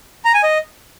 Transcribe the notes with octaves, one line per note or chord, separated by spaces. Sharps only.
A#5
G#5
D#5